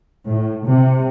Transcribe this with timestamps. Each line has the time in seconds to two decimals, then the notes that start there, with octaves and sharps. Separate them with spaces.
0.25 A2
0.65 C3